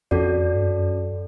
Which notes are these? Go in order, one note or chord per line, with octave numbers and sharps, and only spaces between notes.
F2 C#4 F#4 A4 D5
G2
F#2